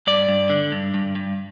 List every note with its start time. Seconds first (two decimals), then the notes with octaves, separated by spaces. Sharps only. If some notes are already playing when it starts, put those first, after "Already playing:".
0.07 G2 D5
0.29 G2
0.50 D3
0.72 G2
0.94 G2
1.15 G2